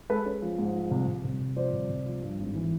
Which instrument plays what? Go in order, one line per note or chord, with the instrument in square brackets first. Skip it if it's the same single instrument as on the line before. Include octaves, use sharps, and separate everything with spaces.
[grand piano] G#3 A4 B4
C#4
F3
G#2
F3
C2
C2
C2
C2
F3 C5 D5
C2
C2
F3
G2
G#1
E3